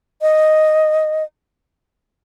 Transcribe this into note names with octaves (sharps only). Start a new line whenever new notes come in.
D#5